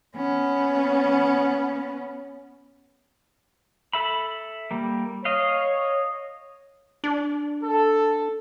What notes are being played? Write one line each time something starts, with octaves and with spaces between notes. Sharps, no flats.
B3 C#4
A4 E5 B5
G3 A#3
C#5 D#5 F5
D4
A4